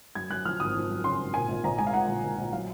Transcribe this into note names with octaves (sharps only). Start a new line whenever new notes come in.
F#2 G#6
F#2 F#6
F3 F6
G#1 D#6
F3
F#2
C#3 C6
G#1
A#2 G#5
A#1
A#1 A#5
G#3 G#5
F5
G#3 F#5
A#1
A#1
A#1
F#3 F5